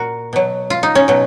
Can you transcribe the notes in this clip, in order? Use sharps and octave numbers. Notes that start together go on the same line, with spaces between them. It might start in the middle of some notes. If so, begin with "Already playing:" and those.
Already playing: A#2 F#4 A#4
B2 F#3
F4
D#4
C#4
B2 F#3